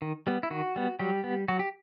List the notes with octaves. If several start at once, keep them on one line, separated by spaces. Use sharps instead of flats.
D#3
G3 B3
E4
D#3 F#4
G3 B3
F#3 G3 G4
B3
F#3 F#4
G4